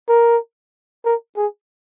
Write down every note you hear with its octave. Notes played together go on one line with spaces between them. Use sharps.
A#4
A#4
G#4